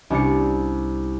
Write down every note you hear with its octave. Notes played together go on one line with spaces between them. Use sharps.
C2 C#4 D4 C7 C#7